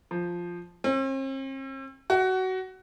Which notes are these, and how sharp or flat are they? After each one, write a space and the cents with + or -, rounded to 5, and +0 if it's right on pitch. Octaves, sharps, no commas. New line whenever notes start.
F3 +0
C4 +45
F#4 +20